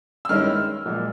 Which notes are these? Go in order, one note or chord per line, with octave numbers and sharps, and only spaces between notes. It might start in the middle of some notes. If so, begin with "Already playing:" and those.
E6
G2 D#3 G#3 C#4 E4 F6
B1 A#2 F3 G#3